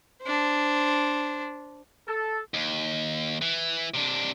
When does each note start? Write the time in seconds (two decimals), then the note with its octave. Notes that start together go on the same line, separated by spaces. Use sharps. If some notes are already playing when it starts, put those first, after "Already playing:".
0.22 D4 C5
2.07 A4
2.54 D#2
3.42 E3
3.94 C3 D4